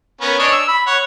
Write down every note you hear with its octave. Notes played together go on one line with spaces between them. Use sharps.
B3 C#4 A#4
D4 C#5 D#5
E6
B5
C#5 F#5